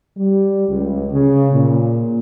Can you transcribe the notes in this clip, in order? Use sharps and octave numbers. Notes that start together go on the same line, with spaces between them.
G3
C#2
C#3
A#2